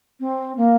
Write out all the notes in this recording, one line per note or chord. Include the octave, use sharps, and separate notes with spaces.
C4
A#3